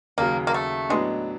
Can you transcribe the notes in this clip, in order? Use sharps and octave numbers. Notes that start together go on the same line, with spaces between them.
D#2 C#3 F#3 A#3
A#3
A3
A2 F#3 G#3 B3 D4